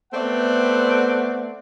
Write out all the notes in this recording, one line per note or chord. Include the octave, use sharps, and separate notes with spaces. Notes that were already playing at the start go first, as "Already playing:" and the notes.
A3 B3 C4 D5 F#5